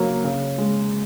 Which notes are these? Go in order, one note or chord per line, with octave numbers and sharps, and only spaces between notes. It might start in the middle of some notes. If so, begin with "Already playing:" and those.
Already playing: C#3 F#3 A#3
C#3
G#3